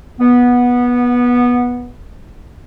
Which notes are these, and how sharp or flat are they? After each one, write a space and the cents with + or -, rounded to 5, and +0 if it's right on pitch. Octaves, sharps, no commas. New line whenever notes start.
B3 -15